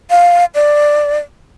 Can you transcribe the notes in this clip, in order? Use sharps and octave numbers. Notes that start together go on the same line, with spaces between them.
F5
D5